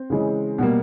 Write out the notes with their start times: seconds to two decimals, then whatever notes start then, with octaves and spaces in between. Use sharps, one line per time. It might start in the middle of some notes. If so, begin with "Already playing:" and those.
Already playing: C4
0.10 C#3 E3 G#3
0.58 B2 G3 A#3